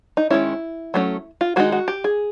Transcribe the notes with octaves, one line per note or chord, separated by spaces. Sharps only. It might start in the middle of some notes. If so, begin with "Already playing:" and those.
D#4
D#3 G#3 C#4 E4
F#3 A3 C#4
F4
D#3 G#3 C4 D#4 F#4
F#4
G4
G#4